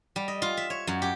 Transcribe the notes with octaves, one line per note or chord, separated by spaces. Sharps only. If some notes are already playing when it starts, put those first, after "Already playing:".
G3
D#5
F4
E5
C#5
F#2
G4